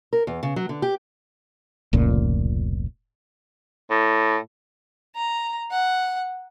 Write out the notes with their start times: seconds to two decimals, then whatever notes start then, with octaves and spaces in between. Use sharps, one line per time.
0.13 A#4
0.27 E2
0.43 C#3
0.56 F#3
0.69 D3
0.82 G4
1.93 F1 C#2 A#2
3.91 A2
5.16 A#5
5.71 F#5